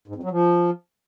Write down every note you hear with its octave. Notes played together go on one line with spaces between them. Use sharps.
G#2
F2
F#3
F3